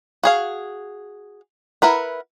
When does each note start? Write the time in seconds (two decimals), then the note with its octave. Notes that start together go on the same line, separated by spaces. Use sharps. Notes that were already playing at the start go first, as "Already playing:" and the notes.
0.24 F#4 G#4 F5
1.82 E4 A#4 B4 F#5